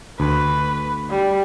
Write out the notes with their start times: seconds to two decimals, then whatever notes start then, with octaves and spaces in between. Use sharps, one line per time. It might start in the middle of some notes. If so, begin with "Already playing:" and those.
0.20 D2 B4
1.10 G3